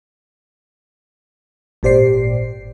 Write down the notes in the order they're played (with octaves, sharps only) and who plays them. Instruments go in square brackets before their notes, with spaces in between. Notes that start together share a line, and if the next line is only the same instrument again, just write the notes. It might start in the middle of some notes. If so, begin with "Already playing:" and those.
[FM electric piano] G#1 A#2 G4 C5 D5 C7